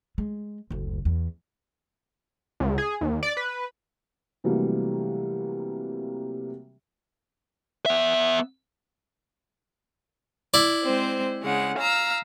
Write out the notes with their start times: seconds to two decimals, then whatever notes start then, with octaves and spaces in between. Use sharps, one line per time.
0.18 G#3
0.70 F#1 D2
1.05 E2
2.60 C#2
2.78 G#4
3.01 D#2
3.23 D5
3.37 B4
4.44 C3 E3 F#3 G3 A3 A#3
7.86 B3 E5
10.54 E4 D5
10.84 G#3 C4 C5
11.42 C#3 G#3 F#5
11.78 F5 A#5 E6